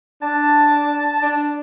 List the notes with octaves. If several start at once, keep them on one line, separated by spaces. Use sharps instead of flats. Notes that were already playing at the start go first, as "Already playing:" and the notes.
D4 A5
D4